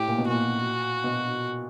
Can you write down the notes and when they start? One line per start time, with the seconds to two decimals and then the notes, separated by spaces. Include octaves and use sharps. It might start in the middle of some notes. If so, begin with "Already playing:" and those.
Already playing: A2 G4
0.08 A#2
0.18 B2
0.27 A#2 F#4
1.04 B2